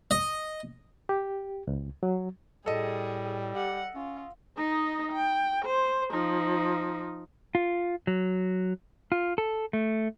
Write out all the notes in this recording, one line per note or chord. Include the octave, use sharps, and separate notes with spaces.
D#5
G4
C#2
F#3
A2 G3 G#4 A4 D#5
G4 F#5
C#4 F4
D#4 D#5
G5
C5
F3 D#4
F4
F#3
F4
A4
A3